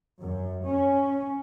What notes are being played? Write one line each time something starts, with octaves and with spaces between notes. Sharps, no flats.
F#2
C#4